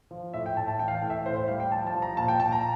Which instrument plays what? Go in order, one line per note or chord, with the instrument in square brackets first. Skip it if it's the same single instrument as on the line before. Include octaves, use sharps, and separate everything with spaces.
[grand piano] F3
A2 E5
G5
A2 A5
A5
E3 G5
F5
G5
A2
E5
A2 C5
C5
G3 F5
G5
F3 A5
A5
F3
A#5
A#2 A5
G5
A#2 A5
A#5